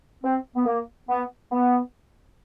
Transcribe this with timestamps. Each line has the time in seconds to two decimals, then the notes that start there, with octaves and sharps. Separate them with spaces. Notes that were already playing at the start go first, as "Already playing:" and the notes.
0.23 C4
0.56 B3
0.66 A#3
1.09 B3
1.52 B3